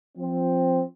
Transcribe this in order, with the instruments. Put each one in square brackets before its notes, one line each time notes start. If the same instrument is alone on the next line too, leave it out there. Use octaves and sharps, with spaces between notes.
[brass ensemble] F3 C4